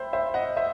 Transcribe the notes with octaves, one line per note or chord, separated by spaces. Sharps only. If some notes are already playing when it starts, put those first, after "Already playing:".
Already playing: C5 E5 G5 B5
C5 E5
D#5 F#5
C5 E5